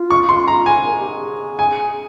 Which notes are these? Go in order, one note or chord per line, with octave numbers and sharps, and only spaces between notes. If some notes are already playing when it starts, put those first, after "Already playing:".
Already playing: F4
C#6
C6
A#5
G#5
A#4
G#4
G4
G#4
G#5